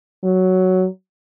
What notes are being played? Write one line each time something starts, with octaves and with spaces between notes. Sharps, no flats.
F#3